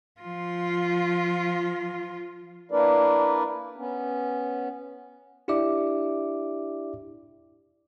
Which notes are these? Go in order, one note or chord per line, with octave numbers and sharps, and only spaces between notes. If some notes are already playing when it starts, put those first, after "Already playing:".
F3 F4
A#3 D4 E4 A#4 B4 D5
B3 C#4
D4 E4 G4 D5 E5 D6